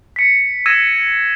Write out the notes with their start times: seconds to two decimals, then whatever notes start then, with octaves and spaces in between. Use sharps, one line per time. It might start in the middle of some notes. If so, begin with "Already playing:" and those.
0.16 B6 C#7
0.66 E6 G#6 A#6 D#7 E7